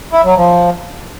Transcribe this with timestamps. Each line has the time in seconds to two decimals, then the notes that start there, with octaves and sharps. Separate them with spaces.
0.13 E4
0.24 F#3
0.36 F3